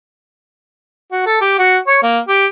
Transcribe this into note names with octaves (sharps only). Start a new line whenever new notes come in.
F#4
A4
G4
F#4
C#5
A#3
G4